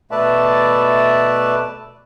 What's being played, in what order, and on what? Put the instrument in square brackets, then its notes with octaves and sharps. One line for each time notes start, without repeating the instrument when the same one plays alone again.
[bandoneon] B2 A3 B4 D5 E5 A5